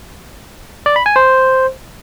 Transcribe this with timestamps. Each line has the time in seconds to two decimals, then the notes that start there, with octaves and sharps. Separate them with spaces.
0.86 D5
0.96 B5
1.06 G#5
1.16 C5